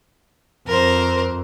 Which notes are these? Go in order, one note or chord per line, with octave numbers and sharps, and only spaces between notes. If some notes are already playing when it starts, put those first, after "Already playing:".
F2 A#4 C5